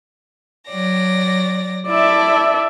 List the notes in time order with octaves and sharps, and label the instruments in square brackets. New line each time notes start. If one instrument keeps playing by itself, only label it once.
[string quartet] F#3 D5 A#6
[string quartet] E4 A4 [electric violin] D5 E5